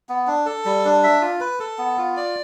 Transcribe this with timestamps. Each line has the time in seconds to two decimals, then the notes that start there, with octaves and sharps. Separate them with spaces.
0.09 B3
0.27 D4
0.46 A4
0.65 G3
0.85 D4
1.04 E5
1.21 F4
1.40 B4
1.60 A4
1.78 B3
1.98 F4
2.17 D5